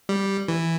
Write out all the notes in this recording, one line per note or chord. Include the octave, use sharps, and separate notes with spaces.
G3
E3